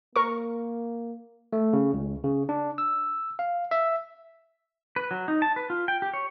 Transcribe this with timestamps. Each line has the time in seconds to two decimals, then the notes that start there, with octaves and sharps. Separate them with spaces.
0.16 A#3 A#4 C#6
1.53 A3
1.73 C#3
1.94 C#2
2.24 C#3
2.49 D4
2.78 E6
3.39 F5
3.71 E5
4.96 B4
5.11 F#3
5.28 D#4
5.42 A5
5.56 B4
5.70 F4
5.88 G5
6.02 G4
6.14 C#5